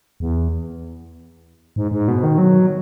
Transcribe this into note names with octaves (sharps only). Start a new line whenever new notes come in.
E2
G#2
G#2
B2
D#3
F#3